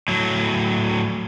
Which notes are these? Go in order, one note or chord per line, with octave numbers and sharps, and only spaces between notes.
A2 F#3